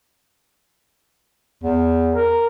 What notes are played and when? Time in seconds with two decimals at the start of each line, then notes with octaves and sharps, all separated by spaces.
1.64 E2
2.15 A#4